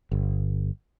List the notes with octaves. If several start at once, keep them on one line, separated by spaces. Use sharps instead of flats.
G1